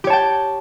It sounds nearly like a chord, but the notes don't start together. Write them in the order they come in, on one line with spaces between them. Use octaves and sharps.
G4 C#5 A5 G5